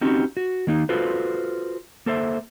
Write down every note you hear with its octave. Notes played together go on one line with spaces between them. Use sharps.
C4 C#4 D#4 F#4 G4
F#4
D#3 A#3 D#4
F4 F#4 A4 B4 C5
A#3 A4 C5 E5